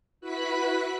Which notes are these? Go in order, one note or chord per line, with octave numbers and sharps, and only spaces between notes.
E4 F#4 B4 B5 F#6 B6